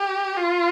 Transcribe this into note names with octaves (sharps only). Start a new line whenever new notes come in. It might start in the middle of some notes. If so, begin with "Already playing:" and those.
Already playing: G4
F4